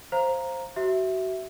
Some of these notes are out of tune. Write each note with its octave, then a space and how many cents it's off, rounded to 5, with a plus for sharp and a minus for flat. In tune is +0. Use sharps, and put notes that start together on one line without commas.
C5 +10 F5 -10 A#5 +0
F#4 +30 E5 +0